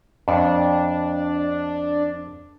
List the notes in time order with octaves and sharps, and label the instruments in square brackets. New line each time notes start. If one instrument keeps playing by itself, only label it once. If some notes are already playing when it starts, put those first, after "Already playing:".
[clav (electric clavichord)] F2 [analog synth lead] D4